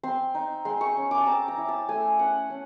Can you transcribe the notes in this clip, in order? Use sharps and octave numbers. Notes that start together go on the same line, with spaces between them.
C4 C6
D#4
G#3 C6
C#6
C#4
D6
A5
C4 A#5
A#5
E4
A5
A3 G#5
C#4 F#5
C#4